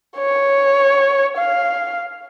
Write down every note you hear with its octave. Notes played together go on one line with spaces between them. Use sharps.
C#5
F5